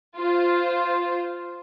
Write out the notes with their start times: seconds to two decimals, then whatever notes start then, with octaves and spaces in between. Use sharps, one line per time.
0.17 F4 C5